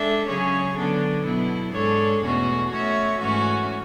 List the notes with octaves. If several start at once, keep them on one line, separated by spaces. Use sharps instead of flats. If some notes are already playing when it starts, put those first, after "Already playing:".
Already playing: G#3 D4 A4 E5
C#3 F#3 C#4 G#4 C#5
D3 F#3 B3 D4 A4
B2 F#3 B3 E4
G#2 G#3 D4 A4 C#5
E2 B2 A3 C#4 F#4
A3 C#4 F#4 C#5 E5
G#2 E3 A3 C#4 F#4